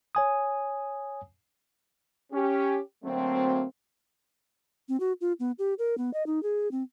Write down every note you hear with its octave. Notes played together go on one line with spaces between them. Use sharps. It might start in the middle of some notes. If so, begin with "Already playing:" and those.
C#5 G#5 D#6
C#4 G4
D2 F#3 A3 A#3 C4
C4
F#4
F4
B3
G4
A#4
B3
D#5
D#4
G#4
C4